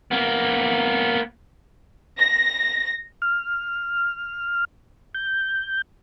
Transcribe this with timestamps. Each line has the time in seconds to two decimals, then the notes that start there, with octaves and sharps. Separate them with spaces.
0.11 A#3 B3
2.19 A#6
3.22 F6
5.15 G6